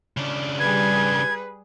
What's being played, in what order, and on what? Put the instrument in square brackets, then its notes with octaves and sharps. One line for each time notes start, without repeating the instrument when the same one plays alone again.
[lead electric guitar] C#3 D4
[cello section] G3 G#4 [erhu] B4 [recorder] G#6